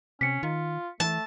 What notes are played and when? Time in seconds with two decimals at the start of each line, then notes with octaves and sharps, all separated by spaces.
0.21 C3 C#4 B6 C#7
0.43 D#3 F4
1.00 E3 A3 A5